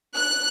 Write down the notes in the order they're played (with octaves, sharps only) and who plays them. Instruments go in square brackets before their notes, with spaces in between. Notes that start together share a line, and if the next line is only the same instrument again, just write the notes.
[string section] F#6